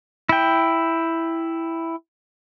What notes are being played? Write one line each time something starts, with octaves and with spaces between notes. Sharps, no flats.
E4 G5